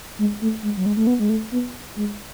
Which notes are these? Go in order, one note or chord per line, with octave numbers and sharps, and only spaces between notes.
G#3
A3
G#3
F#3
G#3
A3
B3
G#3
A3
B3
G#3